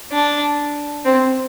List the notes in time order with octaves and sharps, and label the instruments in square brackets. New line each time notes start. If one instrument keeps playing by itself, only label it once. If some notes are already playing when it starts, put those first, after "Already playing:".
[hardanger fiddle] D4
C4